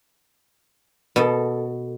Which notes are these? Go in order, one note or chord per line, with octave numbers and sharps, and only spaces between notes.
B2 A4